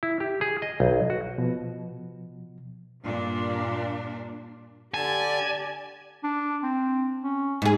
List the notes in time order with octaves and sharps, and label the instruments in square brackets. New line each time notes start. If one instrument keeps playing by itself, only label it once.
[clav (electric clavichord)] E4
G4
G#4
D#5
B1
F#4
[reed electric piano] B2 F3
[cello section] G2 A#2 D4
[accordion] D3 A5 [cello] G4 D5 [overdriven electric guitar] G#5
[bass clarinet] D4
C4
C#4
[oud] G#2 G#4